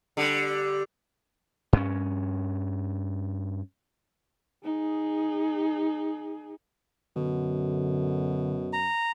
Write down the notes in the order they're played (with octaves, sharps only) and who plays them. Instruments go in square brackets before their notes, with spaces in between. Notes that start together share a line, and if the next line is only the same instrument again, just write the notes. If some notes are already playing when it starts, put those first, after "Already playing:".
[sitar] D3 G3
[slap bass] G2 C#4
[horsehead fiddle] D#4 G#4
[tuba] F#2 [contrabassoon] B2 [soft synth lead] D3
[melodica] A#5